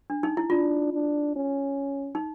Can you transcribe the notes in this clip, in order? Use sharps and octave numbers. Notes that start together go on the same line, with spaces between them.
D4
D#4
E4
D4 F4
D4
C#4
D#4